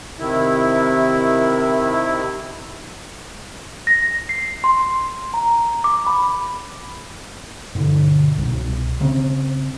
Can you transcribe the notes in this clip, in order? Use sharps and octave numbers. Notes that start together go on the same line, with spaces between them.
C3 D#3 E4
A#6
C7
C6
A#5
D6
B5
G2 B2 D3
C2 B2
C#3 C4